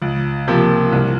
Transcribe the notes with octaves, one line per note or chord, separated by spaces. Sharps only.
C#2
C3 F3 A#3
C2